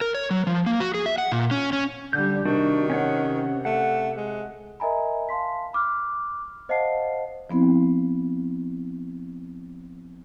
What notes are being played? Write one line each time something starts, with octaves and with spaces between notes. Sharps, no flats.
A#4
C#5
F#3
F3
A#3
F#4
G#4
E5
F#5
A#2
C#4
C#4
D3 G3 G6
C3 D#3 D4 F#4
C#4 C#5 F#5
A3 F#5
G#3
A#4 D#5 E5 G#5 A#5 B5
F5 A5 C6 B6
B5 D6 F6 F#6
C5 D#5 F5 F#5 A5 C7
F3 B3 C4 E4